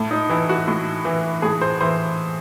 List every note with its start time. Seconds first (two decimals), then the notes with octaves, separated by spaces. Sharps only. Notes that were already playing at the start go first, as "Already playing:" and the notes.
Already playing: A2
0.11 D#4
0.29 E3 E4
0.49 F#4
0.68 A2
1.05 E3
1.42 A2 G#4
1.61 C5
1.81 E3 C5